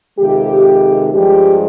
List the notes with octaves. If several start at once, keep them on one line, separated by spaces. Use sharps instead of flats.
F2 C3 D#3 G#3 G4
G2 F3 G#3 G4